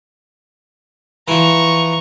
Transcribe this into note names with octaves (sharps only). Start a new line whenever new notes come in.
E3 F3 A#5 C#6